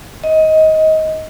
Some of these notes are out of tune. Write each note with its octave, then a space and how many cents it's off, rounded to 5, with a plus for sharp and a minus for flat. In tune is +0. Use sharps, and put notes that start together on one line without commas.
D#5 +15